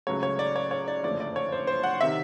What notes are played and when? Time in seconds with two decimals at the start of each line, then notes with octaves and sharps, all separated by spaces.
0.07 C#2 C#3 F#3 A3 C#5
0.23 C#5
0.39 D5
0.56 C#5
0.71 C#5
0.88 D5
1.03 F#1 F2 D3 F3 A3 D5
1.20 D5
1.36 C#5
1.52 C5
1.67 C5
1.83 F#5
2.01 C3 D#3 E5